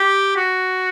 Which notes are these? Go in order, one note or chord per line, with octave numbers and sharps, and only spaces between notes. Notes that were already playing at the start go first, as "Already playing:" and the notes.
Already playing: G4
F#4